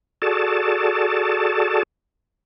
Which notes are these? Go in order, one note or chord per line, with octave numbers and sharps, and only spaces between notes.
F#4 G#4 A4 D5 A5